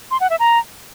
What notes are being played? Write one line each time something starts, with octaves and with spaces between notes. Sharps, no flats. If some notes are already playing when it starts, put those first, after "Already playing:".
C6
F#5
E5
A#5